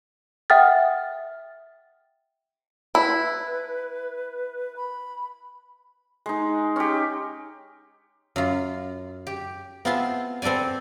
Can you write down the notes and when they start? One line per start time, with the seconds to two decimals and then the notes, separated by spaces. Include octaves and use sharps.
0.50 E5 F#5 G5 D#6 F6 A6
2.95 E4 B4
4.76 B5
6.26 G#3 D#4
6.76 C#4 G4
8.36 F#2 F4
9.27 G4
9.85 B3 C4 F4 E5 A5 C6
10.42 C4 A4 B4 D5 G#5